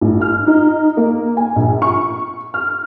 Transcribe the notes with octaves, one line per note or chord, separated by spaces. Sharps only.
A1
F6
D#4
A#3
G#5
A#1
C#6
F6